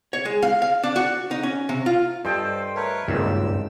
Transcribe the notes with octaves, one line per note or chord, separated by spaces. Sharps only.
C#5
G#3
F5
F5
D4
F#4
D#4
C#4
C3
F4
G2 A4 C5 D#5 G5
A3 A#4 B4 C#5
G#1 C#2 G2 A#2 E6